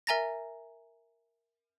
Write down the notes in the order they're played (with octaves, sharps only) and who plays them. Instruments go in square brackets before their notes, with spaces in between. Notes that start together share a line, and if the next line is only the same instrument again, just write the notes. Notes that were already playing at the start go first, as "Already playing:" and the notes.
[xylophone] A#4 E5 G#5 A#5 A6 A#6